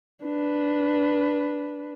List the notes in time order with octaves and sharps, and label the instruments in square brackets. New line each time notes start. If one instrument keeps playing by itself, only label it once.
[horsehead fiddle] D4 B4